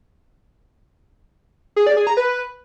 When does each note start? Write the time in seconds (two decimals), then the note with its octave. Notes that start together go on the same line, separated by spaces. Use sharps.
1.76 G#4
1.87 D5
1.97 G#4
2.07 A#5
2.17 B4